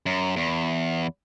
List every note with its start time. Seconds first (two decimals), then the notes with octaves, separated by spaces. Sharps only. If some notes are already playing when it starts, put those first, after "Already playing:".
0.06 F#2
0.36 E2